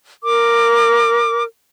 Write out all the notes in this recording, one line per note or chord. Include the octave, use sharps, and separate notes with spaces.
A#4 D6